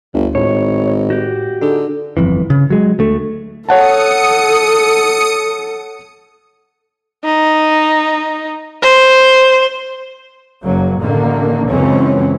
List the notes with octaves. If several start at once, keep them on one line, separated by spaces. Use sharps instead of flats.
G1 D2
G#1 A2 C#5
F#4 G4
D3 D#4 G#4
G1 F2 E3
C#3
F#3 G#3
D2 A3
A4 C#5 F#5 A5 D#6 C#7
D#4
C5
F#1 F#3 A#3
A1 D3 D#3 A#3
C#2 F#2 E3 C4 C#4